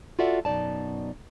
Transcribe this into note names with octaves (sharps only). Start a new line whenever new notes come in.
F4 F#4 A4 D5 E5 F#5
F#2 B2 D#4 D5 A5